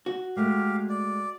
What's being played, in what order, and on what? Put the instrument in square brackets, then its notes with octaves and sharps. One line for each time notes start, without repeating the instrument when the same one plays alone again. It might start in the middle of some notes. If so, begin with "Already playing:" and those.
[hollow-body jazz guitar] F#4
[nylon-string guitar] G#3 A3 [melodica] G4 F5
[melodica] D5